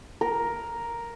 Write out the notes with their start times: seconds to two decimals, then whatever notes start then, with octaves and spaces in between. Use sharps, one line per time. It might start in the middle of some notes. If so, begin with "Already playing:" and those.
0.21 A#4